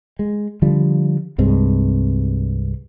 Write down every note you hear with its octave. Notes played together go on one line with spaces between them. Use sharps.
G#3
D3 F3 G3
C2 G2 G#3 C4